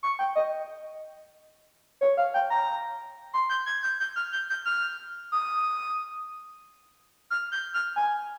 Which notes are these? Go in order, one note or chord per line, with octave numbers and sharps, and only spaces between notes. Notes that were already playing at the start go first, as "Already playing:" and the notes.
C#6
G5
D#5
C#5
F5
G5
A#5
C6
G6
G#6
G6
G6
F6
G6
G6
F6
D#6
F6
G6
F6
G#5